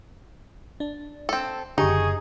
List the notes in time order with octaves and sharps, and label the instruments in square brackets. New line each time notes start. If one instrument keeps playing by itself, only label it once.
[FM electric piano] D4
[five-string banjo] C4 A4
[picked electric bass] F#1 D4 [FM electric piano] D3 G4 C#6 [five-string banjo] D#4 [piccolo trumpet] G#4